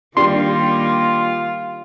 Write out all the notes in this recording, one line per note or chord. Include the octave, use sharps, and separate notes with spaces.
D#3 G3 A#3 D4 F4 G4 C6